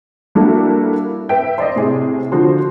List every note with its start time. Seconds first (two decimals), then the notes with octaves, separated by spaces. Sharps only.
0.35 G3 A#3 D4 E4 F#4 A4
1.29 B4 E5 G5
1.58 C5 D5 D#5
1.76 A2 C3 G#4
2.32 D3 F3 F#4 C5